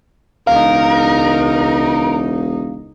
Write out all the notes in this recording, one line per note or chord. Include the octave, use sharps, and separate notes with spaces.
E1 C#2 D#4 A#4 F5